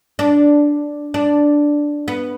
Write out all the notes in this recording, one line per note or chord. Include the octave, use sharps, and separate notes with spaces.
D4
D4
B3